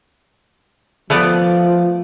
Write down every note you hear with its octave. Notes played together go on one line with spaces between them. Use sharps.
F3 A3 B3 D5